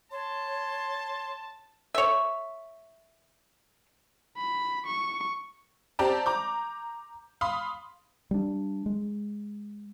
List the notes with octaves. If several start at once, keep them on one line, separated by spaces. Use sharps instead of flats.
C#5 A5 C6
C#5 E5
B5
C#6
C4 G4 D5 A5 A#5
A#5 D6 G6
F5 B5 C6 D#6
G3 C#4 D4
G#3